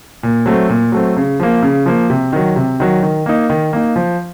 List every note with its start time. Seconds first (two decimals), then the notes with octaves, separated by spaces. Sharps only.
0.23 A#2
0.46 F#3 A3 C4
0.69 A#2
0.92 F#3 A3 C4
1.17 C#3
1.40 F3 A#3
1.62 C#3
1.86 F3 A#3
2.10 C3
2.33 D#3 F#3
2.56 C3
2.80 D#3 F#3
3.02 D#3
3.26 A#3 D#4
3.50 D#3
3.73 A#3 D#4
3.96 F3